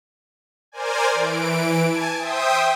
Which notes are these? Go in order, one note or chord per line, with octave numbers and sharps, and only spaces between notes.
A#4 C5 D5 G#5
E3 D7
G#5 A5 G#6
C5 E5 G5 D#6